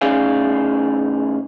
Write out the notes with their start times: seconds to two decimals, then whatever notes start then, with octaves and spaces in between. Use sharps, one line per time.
0.01 A2 C#4 D#4 G#4 D5 F5